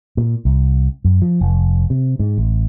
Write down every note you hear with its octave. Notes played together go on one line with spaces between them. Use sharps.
A#2
C2
F#2
F3
F1
C3
G#2
A1